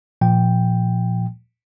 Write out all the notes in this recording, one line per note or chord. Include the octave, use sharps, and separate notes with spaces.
A#2 F3 G5